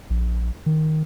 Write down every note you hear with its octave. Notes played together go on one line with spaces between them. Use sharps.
A#1
D#3